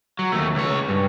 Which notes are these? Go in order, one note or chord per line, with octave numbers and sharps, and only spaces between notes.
F#3
D#2 A3
C#2 C#5
G2